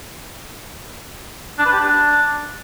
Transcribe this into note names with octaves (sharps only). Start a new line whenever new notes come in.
D4
B4
G4
D4